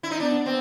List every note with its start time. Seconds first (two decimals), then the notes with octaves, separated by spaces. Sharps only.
0.03 E4
0.11 D#4
0.20 B3 D4
0.45 B3 C4